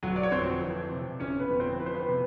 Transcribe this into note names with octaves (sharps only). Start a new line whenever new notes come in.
G1 F#3 F#4
D5
C#5
F2 C4 C5
E3
C3
G1 C#4 C#5
B3 B4
F2
C4 C5
E3 B4
C5
B3 B4
C3